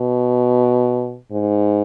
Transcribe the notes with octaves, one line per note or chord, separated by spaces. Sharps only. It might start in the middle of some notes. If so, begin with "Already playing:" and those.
Already playing: B2
G#2